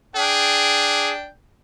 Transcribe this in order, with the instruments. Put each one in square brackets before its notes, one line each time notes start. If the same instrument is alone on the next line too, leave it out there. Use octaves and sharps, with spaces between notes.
[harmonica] D4 G5 [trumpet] G#4